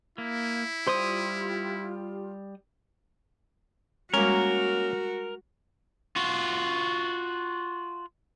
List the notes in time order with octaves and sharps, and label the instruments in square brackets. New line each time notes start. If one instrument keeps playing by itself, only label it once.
[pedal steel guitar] A#3 [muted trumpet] E4
[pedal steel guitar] G3 D#6 [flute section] F4 G4 [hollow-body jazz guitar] C5
[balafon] G3 G#3 [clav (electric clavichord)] A#3 C#4 [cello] F#4 [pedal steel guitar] A#4
[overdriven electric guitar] F4 F#4